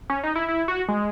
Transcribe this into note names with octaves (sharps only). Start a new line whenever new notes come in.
C#4
D#4
E4
E4
F#4
G#3